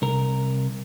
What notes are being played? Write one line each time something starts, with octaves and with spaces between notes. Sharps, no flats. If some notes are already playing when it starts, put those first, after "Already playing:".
C2 A#4